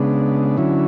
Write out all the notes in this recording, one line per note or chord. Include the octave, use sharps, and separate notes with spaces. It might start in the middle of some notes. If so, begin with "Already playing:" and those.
Already playing: C#3 G#3 B3 D4
D3 F#3 C#4 E4